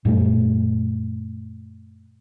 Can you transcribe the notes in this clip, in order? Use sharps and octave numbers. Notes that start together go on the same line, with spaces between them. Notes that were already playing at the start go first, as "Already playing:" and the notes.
F#2 A#2 G3 A3